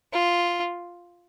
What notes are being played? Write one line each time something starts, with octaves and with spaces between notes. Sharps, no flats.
F4